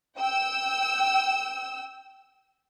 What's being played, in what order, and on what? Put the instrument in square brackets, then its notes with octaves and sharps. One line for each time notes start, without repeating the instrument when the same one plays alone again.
[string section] G5 E6